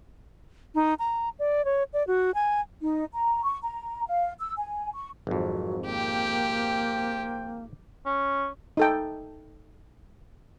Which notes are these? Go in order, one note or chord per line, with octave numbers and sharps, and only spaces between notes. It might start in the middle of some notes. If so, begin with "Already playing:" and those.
D#4
A#5
D5
C#5
D5
F#4
G#5
D#4
A#5
C#6
A#5
F5
E6
G#5
C#6
G#1 F2 F#3
A#3 G4 C5 G5
C#4
D#4 A4 G5